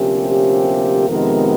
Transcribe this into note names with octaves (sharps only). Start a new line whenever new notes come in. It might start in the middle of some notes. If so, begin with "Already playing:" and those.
Already playing: D2 C3 F3 A#3 C#4 G4
G4
F2 C3 D#3 G#3 B3 A#4